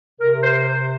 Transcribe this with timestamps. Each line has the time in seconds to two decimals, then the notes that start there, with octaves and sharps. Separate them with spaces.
0.20 C3 A#4
0.42 C5